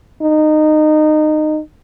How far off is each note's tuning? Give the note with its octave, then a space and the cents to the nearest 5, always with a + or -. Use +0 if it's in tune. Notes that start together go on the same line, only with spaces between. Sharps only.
D#4 -20